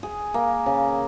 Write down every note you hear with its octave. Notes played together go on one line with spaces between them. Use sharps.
G#4
A#3
C#3